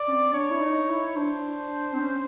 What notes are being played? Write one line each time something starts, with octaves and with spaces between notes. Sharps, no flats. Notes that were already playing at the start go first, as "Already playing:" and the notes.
Already playing: D5
C#4
C4
D4 C#5
E4
D#4
E4
D4 C5
C4
C#4